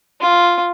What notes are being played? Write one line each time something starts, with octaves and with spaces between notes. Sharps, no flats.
F4